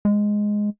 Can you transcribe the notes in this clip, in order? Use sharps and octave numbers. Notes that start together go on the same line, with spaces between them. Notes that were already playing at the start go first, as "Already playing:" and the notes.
G#3